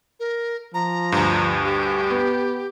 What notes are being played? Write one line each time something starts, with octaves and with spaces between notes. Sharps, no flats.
A#4
F3 A#5
D2 G2
G4
B3